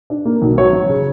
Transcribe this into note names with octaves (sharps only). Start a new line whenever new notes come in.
D4
A#3
B1
F#3 C#5
F#2
C#3